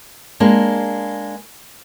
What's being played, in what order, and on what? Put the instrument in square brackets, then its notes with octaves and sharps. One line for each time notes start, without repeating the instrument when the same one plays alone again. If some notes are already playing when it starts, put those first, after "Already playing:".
[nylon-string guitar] G#3 A#3 D4